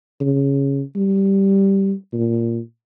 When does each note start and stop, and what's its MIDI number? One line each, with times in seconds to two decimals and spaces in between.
0.21 0.82 49
0.96 1.93 55
2.13 2.59 46